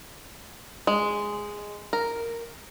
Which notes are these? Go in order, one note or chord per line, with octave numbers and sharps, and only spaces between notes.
G#3
A#4